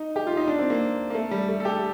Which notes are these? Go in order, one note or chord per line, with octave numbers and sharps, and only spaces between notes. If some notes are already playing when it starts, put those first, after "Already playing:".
Already playing: D#4
G4
F4
D#4
D4
C4
A#3
A#3
A3
G3
A3
A4
G4